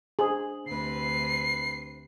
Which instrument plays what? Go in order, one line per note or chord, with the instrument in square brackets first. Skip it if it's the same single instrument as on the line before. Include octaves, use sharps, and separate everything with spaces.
[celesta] D4 C5 F#7 [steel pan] G#4
[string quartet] D2 C3 B4 [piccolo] C7